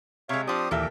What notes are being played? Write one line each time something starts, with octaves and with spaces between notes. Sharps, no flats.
C3 G#3 C#5 E5 F5
F3 C4 D4 G4 D#6
D#2 A#2 E3 G4 A4 A#4 E5 D6